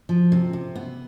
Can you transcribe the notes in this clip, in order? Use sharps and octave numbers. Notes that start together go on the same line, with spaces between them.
F3
C3
C3
B3